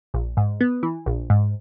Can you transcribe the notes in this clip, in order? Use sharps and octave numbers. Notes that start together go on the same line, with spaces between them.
A#1
G#2
B3
E3
A#1
G#2